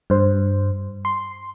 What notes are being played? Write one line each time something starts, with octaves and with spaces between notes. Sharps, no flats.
G2 C5
C6